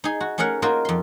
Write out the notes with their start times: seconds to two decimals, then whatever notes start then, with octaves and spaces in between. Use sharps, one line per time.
0.04 D#4 G#4
0.20 F#4
0.38 A3 C#4 G#4 A#4 F#5
0.62 A#3 D#4 F4 F#4 G#4 A#4
0.85 F2 C6